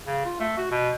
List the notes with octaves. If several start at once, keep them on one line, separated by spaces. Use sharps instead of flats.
C#3
F4
A3
F#4
B2